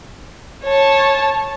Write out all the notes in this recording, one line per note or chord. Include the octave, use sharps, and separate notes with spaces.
C#5 A5